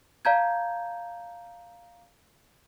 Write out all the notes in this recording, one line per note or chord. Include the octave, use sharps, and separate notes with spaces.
D5 F5 A5 A#5 G6 G#6